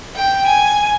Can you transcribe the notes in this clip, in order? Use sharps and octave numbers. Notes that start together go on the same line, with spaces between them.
G5
G#5